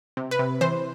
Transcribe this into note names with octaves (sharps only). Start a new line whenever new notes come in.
C3
B4
C3
E3 C5